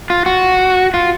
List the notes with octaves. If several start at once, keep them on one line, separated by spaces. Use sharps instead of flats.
F4
F#4
F4